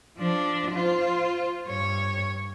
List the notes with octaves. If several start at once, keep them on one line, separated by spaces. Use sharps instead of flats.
F3 D4
F4 C5
G2 C#5